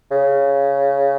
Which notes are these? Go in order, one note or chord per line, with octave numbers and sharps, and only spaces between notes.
C#3